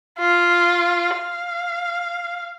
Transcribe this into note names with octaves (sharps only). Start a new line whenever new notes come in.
F4
F5